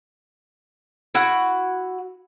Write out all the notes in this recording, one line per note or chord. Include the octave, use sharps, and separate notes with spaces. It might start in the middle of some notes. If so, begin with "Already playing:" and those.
E4 F#4 F#5